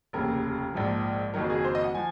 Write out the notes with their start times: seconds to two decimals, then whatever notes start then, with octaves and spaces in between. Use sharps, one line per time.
0.13 F1 D#2 C#3 A#4
0.74 A#1 G#2 F3
1.34 F#1 F2 D#3 F#3 A#4
1.50 G#4
1.65 C5
1.75 D#5
1.84 F#5
1.95 F3 G#5